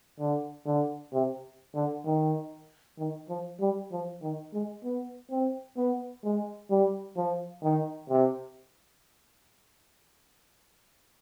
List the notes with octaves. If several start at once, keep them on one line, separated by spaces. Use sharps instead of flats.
D3
D3
C3
D3
D#3
D#3
F3
G3
F3
D#3
G#3
B3
C4
B3
G#3
G3
F3
D#3
C3